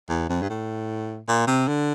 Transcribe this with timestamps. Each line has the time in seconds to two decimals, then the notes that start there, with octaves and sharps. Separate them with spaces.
0.09 E2
0.29 F2
0.42 G2
0.49 A2
1.28 A#2
1.47 C3
1.68 D3